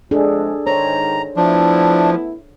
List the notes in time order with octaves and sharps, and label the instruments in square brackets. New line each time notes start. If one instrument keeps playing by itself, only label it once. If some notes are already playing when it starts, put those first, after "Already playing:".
[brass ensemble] C3 F3 G#3 [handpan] D4 G#4 A4
[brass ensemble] G#2 D#3 [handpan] C5 C#5 [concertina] A#5
[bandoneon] F3 [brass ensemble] A3 B3 E4 [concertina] D4